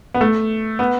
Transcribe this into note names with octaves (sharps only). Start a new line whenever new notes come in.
B3
A3
B3